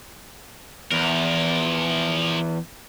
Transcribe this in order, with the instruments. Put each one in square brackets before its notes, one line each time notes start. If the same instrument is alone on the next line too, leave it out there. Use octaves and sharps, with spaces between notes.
[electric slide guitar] E2 [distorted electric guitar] F3 A#4